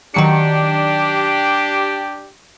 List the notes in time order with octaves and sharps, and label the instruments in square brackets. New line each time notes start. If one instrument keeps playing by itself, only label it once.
[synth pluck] D#3 F#3 C#7 [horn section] D4 G4